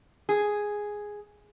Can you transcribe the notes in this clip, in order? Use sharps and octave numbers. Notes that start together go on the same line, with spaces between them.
G#4